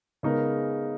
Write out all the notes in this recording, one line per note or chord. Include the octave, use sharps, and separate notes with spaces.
C#3 G#3 B3 D#4 A#4